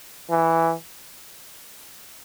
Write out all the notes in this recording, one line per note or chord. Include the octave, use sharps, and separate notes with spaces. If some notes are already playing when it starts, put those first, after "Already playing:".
E3